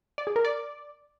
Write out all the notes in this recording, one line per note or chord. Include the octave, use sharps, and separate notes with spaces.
D5
G#4
A#4
D5